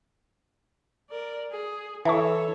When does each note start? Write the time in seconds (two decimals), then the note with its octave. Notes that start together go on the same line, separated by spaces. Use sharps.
1.10 A#4 D5
1.51 G#4
2.05 E3 A4 C#5 E5 A5 C#6